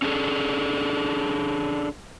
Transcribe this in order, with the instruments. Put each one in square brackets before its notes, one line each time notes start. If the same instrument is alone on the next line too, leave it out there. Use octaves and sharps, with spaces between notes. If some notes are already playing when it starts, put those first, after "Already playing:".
[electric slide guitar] C#4 D4 F4 F#4 G#4 A4